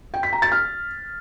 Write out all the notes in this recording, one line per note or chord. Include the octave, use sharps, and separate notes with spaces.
G5
B6
A#5
A6
F6